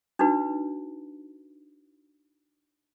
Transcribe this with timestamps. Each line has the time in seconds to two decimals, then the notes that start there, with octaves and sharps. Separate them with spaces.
0.19 D4 D#4 F#4 B4